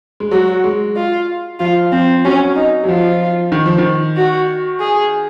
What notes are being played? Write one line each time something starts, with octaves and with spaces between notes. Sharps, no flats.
G#3
F#3 F#4
G#3
F4
F3 F4
F3 C4
F#3 C#4
D#4
F#3
F3 F4
D#3
F3
D#3
F#4
G#4